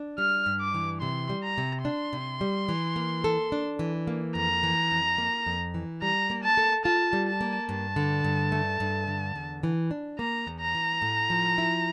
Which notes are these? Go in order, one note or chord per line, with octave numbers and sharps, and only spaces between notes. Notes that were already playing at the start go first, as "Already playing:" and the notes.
Already playing: D4
G3 F6
G2
D6
E3
C3 C6
G3
A#5
C3
D4 C6
C3
G3
E3
A#3
A4
D4
E3
A#3
F2 A#5
E3
F2
A#3
F2
E3
G3 A#5
A#3
A5
A4
F4 A5
G3
A5
A#3
G2 A5
D3
G2
A3
G2
D3
E2
E3
D4
A#3 A#5
E2
A#5
E3
A2
F3
E4